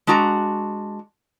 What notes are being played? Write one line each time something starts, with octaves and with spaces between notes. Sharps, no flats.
G#3 D4 F#4 A#5